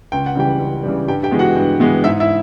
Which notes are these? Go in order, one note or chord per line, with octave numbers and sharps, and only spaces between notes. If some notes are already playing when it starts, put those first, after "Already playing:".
C#2 G5
F#5
C#3 E3 G3 G4 G5
C#2
C#3 E3 G3
G2 G4 G5
G4 G5
E3 G#3 B3
F#4 F#5
G2
E3 G#3 B3
G#2 E4 E5
E4 E5